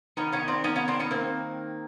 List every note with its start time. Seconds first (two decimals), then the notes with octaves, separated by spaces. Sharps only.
0.17 D#3 B3 C#4
0.32 B3 C#4
0.40 D#3
0.48 C4 D4
0.64 D#3 B3 C#4
0.76 B3 C#4
0.88 C4 D4
1.00 B3 C#4
1.11 A#3 C4